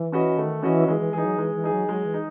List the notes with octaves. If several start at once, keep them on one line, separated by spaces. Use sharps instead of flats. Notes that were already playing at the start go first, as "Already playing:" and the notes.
Already playing: E3
C#4 F#4 B4 D#5
D#3 A3
E3 C#4 F#4 B4 D#5
E3 G#3
E3
E3 D#4 G#4
F#3
E3 G#3
E3
D#4 G#4
F#3
F#3 G#3
E3
D#4